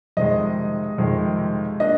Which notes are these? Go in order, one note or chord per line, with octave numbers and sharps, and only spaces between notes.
F2 C3 D#3 G#3 D#5
F2 C3 D#3 G#3
A#3 D4 D#5